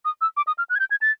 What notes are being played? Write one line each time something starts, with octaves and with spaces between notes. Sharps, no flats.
D#6
E6
D6
D#6
F6
F#6
G#6
G6
G#6
A6